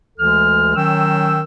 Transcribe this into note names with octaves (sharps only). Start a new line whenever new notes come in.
D2 E3 G#3 A4 F6
D#3 F#3 C#4 G5 E6